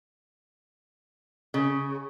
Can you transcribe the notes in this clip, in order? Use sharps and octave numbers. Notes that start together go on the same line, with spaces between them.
C#3